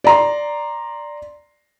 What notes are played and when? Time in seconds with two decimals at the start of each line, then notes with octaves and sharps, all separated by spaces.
0.04 D5 A#5 C6